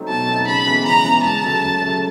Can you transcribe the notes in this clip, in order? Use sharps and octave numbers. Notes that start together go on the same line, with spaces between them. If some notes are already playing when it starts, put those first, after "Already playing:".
Already playing: F#3 A3 C4 D#4
B2 A5
F#3 A3 C4 D#4
C#3 B5
E3 G#3 B3
C#3 A#5
E3 G#3 B3
D2 A5
C#3 F#3 A3
D2
C#3 F#3 A3